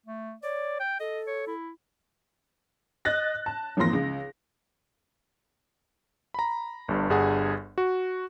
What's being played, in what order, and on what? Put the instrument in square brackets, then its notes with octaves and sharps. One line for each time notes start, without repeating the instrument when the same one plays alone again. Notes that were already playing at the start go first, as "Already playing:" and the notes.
[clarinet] A3
[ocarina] C#5 [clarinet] D5
[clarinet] G5
[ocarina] A4 [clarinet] D#5
[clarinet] C#5
E4
[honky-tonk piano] D#5 F#6 A6 A#6
A5
G#1 E2 F3 A#3 C6 A#6
C#2
[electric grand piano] A#5 B5
G1 G2
G1 G2 G#4 F#5 G#5
F#4